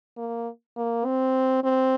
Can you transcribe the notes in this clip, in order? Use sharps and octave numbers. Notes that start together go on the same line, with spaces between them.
A#3
A#3
C4
C4